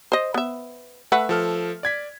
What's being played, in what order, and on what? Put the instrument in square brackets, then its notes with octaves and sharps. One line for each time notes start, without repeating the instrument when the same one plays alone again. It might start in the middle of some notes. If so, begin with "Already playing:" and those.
[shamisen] C5 D#5
B3 E5
[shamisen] A3 B4 F#5 [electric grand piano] E5
[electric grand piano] F3 A4 F6
D5 G#6 B6